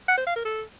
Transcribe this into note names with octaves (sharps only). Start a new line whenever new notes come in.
F#5
C5
F5
A#4
A4